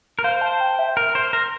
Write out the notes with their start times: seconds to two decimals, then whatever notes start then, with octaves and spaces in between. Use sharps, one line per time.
0.19 A#4
0.24 C5 F5
0.41 A5
0.61 G5
0.79 E5
0.97 A#4
1.15 C5
1.33 A#4